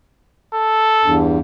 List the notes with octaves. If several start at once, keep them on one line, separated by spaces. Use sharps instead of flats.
A4
E2 G2